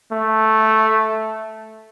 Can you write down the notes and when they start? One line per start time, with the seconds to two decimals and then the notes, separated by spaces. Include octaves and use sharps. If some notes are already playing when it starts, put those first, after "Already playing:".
0.12 A3